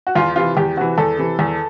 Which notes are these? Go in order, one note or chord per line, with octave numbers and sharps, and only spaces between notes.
F#4
E2 F4
C3 E3 F4
E2 G4
C3 E3 F#4
E2 A4
C3 E3
E2